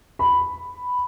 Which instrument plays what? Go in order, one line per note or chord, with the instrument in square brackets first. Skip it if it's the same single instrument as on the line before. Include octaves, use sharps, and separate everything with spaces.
[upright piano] B5